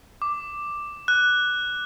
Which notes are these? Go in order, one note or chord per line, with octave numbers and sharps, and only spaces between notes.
D6
F#6